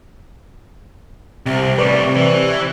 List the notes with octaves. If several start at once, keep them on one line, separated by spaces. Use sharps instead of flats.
C2 C3
A2 G3 B4 D5 C#6
E3